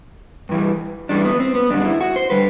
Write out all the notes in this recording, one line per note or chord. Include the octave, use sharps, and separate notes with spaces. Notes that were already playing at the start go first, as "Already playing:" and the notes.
G2 E3 G3
G2 E3 G3 D4
B3
C4
B3
F#2 D3 G3 D4
D4
E4
F#4
C5
D3 G3 B4